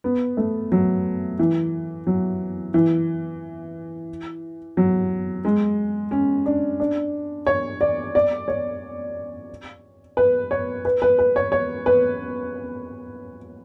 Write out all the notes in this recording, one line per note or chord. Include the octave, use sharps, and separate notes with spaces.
B3
A3
F#3
E3
F#3
E3
F#3
G#3
C#4
D4
D4
C#5
D5
D5
C#5
B4
C#5
B4
B4
B4
C#5
C#5
B4